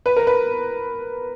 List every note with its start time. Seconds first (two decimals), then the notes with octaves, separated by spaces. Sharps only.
0.06 B4
0.17 A#4
0.27 B4